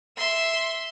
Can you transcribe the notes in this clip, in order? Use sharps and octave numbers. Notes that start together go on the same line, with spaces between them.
E5 C6